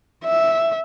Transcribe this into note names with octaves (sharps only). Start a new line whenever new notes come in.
E5